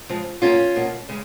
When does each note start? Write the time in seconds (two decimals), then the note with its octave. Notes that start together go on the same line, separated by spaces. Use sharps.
0.09 C#3 F3 G#3
0.42 B2 A#3 C#4 F4
0.76 B2 A#3
1.09 C#3 G#3